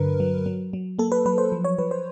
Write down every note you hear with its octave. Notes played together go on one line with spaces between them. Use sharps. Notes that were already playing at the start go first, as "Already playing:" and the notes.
Already playing: G2 D3 F#3 A#4 B4
F#3
F#3
F#3
A#3 A4
B4
F#3 B4
C5
F3
C#5
F3 B4
C5